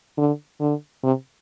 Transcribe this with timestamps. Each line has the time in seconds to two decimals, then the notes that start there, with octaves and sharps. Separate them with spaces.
0.17 D3
0.60 D3
1.04 C3